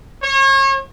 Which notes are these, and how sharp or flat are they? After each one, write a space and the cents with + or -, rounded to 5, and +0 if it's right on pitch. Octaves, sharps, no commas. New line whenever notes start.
C#5 -35